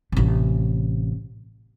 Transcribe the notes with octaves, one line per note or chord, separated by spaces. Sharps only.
A1 C3